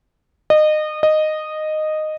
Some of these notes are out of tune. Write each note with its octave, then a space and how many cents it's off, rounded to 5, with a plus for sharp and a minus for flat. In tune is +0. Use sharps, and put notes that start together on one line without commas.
D#5 -25
D#5 -10